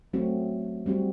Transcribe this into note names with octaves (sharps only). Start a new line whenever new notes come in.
F#3 A3 C4 F#4
G3 C4 F#4